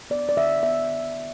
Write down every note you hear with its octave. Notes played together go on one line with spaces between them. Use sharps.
B3 D5
D5
D3 E5
B3 E5